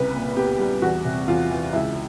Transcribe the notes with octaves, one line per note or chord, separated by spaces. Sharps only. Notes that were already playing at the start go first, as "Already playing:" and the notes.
Already playing: C2 C#3 B4
A#2
B3 G4
G3
E2 F#4
C3
E2 F4
E3
C#2 E4